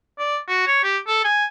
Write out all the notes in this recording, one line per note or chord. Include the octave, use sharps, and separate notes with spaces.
D5
F#4
C#5
G4
A4
G#5